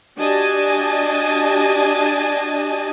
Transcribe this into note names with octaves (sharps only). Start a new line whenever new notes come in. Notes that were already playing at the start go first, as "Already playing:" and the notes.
D4 F#4 G4 D#5 G#5 A5